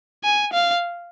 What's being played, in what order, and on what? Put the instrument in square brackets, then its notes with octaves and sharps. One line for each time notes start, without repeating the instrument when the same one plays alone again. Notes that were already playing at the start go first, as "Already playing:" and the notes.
[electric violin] G#5
F5